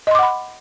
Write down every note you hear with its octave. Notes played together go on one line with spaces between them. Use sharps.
D#5 F#5 B5 C6 D6